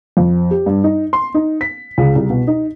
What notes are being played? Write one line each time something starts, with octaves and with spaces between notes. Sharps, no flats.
F2
G4
G2
D#4
C6
D#4
B6
C#2
C2
B2
D#4